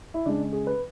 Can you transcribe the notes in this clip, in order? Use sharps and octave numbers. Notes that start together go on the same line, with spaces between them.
E4
C#3 G#3 D4
G#4
B4